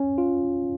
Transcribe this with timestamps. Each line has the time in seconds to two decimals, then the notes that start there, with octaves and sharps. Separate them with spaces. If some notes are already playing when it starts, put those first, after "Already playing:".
Already playing: C#4
0.18 F4